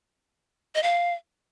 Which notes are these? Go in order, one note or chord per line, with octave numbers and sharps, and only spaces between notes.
D#5
F5